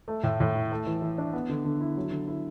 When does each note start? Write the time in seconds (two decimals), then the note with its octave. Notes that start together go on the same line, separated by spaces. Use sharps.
0.08 A3
0.24 A2
0.40 A2
0.55 E4
0.72 A3
0.87 E3
1.02 E3
1.18 D4
1.33 B3
1.49 D3
1.65 D3
1.81 E4
1.97 F#3
2.12 D3
2.28 E4